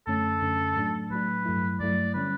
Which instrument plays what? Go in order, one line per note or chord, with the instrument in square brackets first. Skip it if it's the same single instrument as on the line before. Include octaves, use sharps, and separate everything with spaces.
[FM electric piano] F#2 D3 A3 C#4 [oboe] A4
[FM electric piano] F#2 D3 A3 C#4
A2 F#3 A3 D4
[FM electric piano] A2 F#3 A3 D4 [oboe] B4
[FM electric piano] G2 F#3 A3 E4
[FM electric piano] G2 F#3 A3 E4 [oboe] D5
[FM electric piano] D3 G3 C#4 [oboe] B4